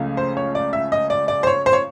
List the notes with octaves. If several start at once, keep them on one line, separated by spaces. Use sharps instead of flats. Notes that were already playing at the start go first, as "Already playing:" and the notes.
Already playing: C#2 C#3 F3 A3 C#4
C5
C#5
D5
E5
D#5
D5
D5
C5
C#5
C5
C#5